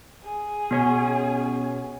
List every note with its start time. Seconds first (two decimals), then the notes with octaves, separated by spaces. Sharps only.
0.24 G#4
0.71 B2 B3 C#4 C#5